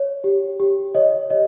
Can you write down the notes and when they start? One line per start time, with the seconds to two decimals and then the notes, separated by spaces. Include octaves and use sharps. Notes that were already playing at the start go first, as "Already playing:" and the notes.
Already playing: C#5
0.24 G4
0.60 G4
0.95 C#5 D#5
1.30 C#5 D#5